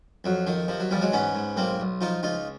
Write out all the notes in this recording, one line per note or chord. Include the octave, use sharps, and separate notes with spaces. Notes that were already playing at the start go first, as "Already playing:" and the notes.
F2 F#3
D#3 F3
C3 F3
F#3
E2 F3 G3
F#3 G#3
G#2 B3 C#4
G#2
B1 A#3 C4
B1
F3 D#4 F4
C#2 D#4 F4